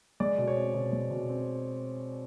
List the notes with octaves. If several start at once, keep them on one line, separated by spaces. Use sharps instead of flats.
G#3 D5
B2
C#5
C4
B2
G#3
B2
C4